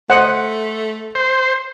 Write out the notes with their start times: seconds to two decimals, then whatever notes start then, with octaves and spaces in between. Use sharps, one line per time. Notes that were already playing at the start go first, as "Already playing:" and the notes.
0.10 A3 C5 D#5 F#5 F#6
1.15 C5